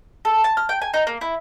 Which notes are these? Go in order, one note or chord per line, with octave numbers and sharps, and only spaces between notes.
A4
A5
F6
G5
G#5
D#4
A#3
E4